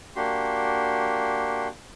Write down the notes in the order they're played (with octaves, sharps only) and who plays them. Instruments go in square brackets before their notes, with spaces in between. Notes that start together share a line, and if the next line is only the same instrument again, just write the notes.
[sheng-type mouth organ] A#3 D4 F#4 G4 C6